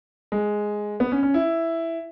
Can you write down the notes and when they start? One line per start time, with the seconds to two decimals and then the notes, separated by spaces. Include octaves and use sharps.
0.32 G#3
1.00 B3
1.12 C#4
1.23 C#4
1.34 E4